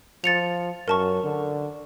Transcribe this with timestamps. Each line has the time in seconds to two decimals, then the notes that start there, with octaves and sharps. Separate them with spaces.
0.24 F3 A6 C#7 F7
0.88 F#2 A#4 A5 C#6
1.23 D3